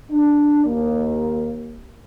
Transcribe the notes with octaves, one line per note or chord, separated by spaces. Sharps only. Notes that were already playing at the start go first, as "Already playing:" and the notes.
D4
D#2 A#3